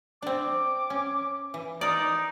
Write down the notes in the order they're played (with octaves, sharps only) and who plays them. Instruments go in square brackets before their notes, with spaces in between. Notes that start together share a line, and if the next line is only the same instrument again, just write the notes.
[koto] C4 D4 [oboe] D6
[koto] C#4
E3
[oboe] D#4 [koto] A#4 D5